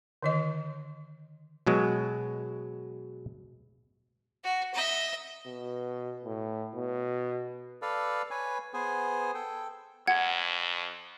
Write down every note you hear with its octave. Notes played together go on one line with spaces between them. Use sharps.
D3 D#3 D#5
B2 F#3 G#3
F#4
D#5 E5
B2
A2
B2
A4 B4 D5 F5
B4 C#5 G#5
B3 G#4 C5 G#5
A4 G5
F2 F#5 G#6